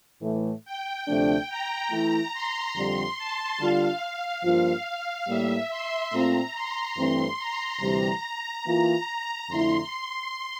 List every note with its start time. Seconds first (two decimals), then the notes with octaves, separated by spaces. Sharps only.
0.22 A2 E3 A3
0.65 G5
1.06 D2 C3 F3 A3 D4
1.49 A#5
1.91 E3 A3 E4
2.33 C6
2.76 F2 D3 G3
3.18 A5
3.59 D3 G3 D4 F4 F5
4.44 G2 F3 A#3 F4
5.28 A2 G3 A#3 E5
5.70 C6
6.12 A#2 A3 C4 F4 A#5
6.55 C6
6.96 G2 E3 A3 C4 C6
7.39 A#5
7.81 D2 C3 E3 G3 A#5
8.65 E3 A#3 F4 A#5
9.49 F2 D3 A3 E4 C6